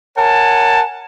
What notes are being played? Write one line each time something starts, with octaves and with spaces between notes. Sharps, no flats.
A#4 C#5 F#5 G#5 A5